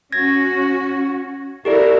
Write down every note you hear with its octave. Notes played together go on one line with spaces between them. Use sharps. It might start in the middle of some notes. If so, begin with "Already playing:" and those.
C#4 F#4 G#6 A#6
E4 F#4 G4 A4 A#4 D5